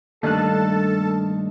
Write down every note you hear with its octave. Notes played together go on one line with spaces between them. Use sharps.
G2 D#3 G3 A3 A#3 A4 A5 F#6